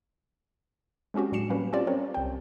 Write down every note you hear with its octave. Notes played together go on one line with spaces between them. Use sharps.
G#3 C4 C#4 F#4 G4
A2 F#3 D4 C7 C#7 E7
F#3 G3 A#3 C#4 B4
C4 C#4 F4 G4 D5
C4 C#4 A#4 C5 C#5
C2 G5